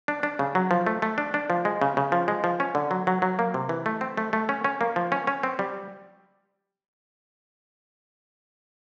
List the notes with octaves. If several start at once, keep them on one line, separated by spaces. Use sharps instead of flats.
D4
D4
C#3
F#3
F3
A3
A3
D4
D4
F3
G#3
C#3
C#3
F3
G#3
F3
C#4
D3
F#3
F#3
F#3
A#3
C3
E3
A3
C4
A3
A3
C#4
C#4
A#3
F3
C#4
C#4
C4
G3